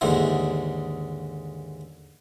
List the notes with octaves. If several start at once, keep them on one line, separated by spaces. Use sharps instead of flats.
D#2 G#2 D3 E3